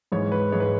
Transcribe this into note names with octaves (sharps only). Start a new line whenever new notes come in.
G#2 E3 G#3 C#5
B4
G#2 E3 G#3 C#5
B4